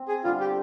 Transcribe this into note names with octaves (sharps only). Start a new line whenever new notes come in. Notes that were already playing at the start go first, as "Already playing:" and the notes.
Already playing: C4
G#4
D3 G3 C4 F4
G4